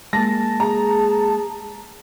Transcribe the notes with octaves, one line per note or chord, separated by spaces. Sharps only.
G#3 A#3 A5 A#6
G#4 A#5